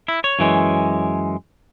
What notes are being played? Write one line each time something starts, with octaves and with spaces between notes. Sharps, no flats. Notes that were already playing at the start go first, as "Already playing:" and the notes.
E4
C#5
F#2 E3 G#3